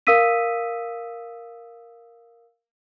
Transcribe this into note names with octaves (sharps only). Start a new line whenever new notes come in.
A#4 F5 D#6 E6 B6 D#7